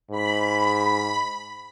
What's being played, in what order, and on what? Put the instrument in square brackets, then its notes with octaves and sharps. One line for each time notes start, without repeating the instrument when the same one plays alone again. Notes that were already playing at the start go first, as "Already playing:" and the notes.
[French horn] G#2 [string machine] B5